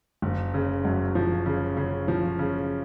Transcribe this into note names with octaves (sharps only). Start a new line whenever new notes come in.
F#1
C#3
F#2
F3
C#3
C#3
F3
C#3